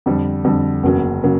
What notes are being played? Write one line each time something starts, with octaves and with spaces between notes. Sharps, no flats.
F2 D3 G3
F2 D3 G3
F#1 E2 C#3 F#3 A#3
C#3 F#3 A#3